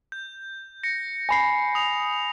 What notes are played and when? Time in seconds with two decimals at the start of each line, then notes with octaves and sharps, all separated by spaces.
0.12 G6
0.83 A#6 C#7
1.29 G#5 B5 C7
1.75 D#6 F7